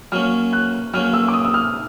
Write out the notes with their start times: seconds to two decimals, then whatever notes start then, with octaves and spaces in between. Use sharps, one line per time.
0.12 F#3 A#3 C#4 F6
0.53 F#6
0.94 F#3 A#3 C#4 F6
1.13 E6
1.28 D6
1.34 D#6
1.45 E6
1.54 F6